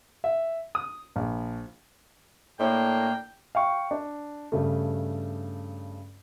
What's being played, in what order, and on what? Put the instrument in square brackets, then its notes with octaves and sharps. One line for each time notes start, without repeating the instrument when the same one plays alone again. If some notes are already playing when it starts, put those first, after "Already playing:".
[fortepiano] E5
D#6
A#1
[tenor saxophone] A2 [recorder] A#3 [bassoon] D4 [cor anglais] G5
[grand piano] F5 G5 C#6
D4
G2 C#3 A3